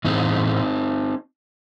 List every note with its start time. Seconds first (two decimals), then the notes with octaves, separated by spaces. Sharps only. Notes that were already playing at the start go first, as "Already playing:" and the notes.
0.05 A2 E3 C4 D#4